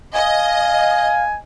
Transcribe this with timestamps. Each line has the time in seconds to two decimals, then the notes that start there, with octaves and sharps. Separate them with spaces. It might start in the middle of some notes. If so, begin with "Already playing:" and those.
0.15 D#5 F5 G#5